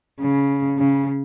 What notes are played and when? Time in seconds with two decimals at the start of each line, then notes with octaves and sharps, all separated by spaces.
0.21 C#3
0.78 C#3